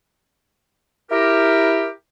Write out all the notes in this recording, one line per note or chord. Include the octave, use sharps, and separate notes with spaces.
E4 G4 A#4